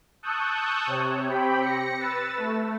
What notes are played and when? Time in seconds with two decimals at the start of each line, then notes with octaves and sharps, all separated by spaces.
0.23 A5 C#6 D#6 E6 F#6 G6
0.87 C3 C#5
1.28 C4 G4 G5 B5
1.61 A#6 C#7
1.98 B4 E6 A6
2.36 A3